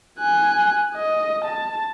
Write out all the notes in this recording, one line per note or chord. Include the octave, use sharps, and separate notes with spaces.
G#5 F#6
D#5
A5